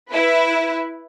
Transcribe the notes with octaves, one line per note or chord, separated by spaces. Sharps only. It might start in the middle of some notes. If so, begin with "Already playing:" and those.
E4 B4